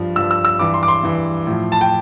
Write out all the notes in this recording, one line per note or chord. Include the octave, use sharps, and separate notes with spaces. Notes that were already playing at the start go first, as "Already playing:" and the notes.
Already playing: G2 F3
G2 F3 E6
E6
E6
G2 E3 D6
C6
D6
C6
G2 E3
A2 F3
A5
G5